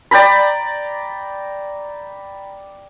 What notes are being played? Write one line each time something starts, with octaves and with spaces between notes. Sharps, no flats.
D5 G5 A#5 B5